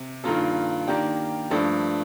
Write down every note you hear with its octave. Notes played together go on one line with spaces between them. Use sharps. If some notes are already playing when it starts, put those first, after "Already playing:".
Already playing: C3
G2 D#3 A#3 F4 A4
D#3 A#3 D4 G4
G2 F3 A3 D4 A4